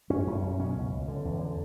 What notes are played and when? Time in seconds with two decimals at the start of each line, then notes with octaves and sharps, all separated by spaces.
0.10 F#2 C#4
0.27 F#2
0.43 F#2
0.59 B2 C#4
0.76 C#2
0.92 C#2
1.08 D3
1.25 E2
1.41 D3